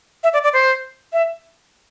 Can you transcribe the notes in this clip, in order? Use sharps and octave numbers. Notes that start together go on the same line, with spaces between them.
E5
D5
D5
C5
E5